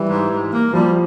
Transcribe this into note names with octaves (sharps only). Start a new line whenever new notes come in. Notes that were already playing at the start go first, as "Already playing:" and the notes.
Already playing: E3 G3
G#2
G#2
A#3
F3 G3